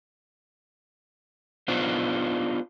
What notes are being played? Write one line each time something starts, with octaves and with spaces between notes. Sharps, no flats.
B3 D4 D#4 F4 C5